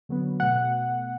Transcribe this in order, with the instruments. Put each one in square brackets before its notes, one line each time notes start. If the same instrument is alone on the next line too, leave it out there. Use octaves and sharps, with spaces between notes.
[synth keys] D3 F#3 B3
B2 A3 F#5